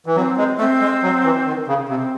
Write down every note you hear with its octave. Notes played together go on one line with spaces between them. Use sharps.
E3
F#3 C4
G#3
A3 C4
G#3
F#3
E3
D#3
C#3
C3 C4